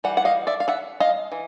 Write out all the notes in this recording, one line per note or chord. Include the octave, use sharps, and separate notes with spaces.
E3 G3 F#5
F#5
D#5 F5
D5 E5
F5
E5 F#5
D#5 F5
E3